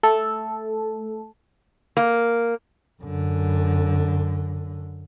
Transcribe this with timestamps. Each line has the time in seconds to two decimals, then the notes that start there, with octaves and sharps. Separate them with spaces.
0.03 A3 A4
1.97 A#3
3.02 F#2 D3